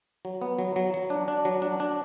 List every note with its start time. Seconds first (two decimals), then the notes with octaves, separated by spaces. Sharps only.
0.25 F#3
0.42 B3
0.59 F#3
0.76 F#3
0.94 F#3
1.10 D4
1.28 D4
1.45 F#3
1.62 D4
1.80 D4